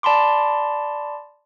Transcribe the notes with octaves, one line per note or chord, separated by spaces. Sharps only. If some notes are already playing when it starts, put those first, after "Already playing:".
D5 A5 B5 C6 D6